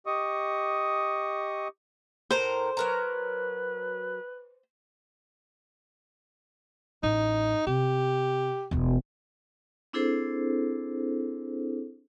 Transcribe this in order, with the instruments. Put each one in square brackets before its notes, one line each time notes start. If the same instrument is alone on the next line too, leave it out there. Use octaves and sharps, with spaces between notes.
[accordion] G4 D#5 C#6 D#6
[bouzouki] A2 A#4 A#5 [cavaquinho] C5
[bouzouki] F#3 A#4 A#5 [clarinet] B4
[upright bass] A1 [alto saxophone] D#4
[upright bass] C3 [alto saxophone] G4
[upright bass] E1 D2
[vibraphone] C4 D4 E4 G#4 A4 C5